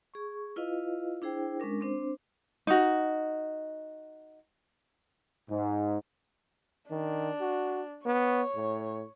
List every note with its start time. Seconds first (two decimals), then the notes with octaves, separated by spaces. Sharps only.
0.14 G#4 C#6
0.56 E4 F4 B4 D#5 F5
1.22 D4 E4 G#4 C5 G5
1.60 G#3 C#4 D4 A#4
1.81 C4 D4 C5
2.67 D#4 F#4
5.50 G#2
6.91 D#3 D4
7.41 F#4
8.06 B3 C#5
8.56 A2